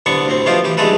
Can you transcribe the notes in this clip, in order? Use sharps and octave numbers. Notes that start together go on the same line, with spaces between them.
C2 D3 B3 D4 C#6
D2 A2 C4
B2 F3 A3 B3 F4 G4
E3 G4
B1 G2 G#3 A3 A4 B4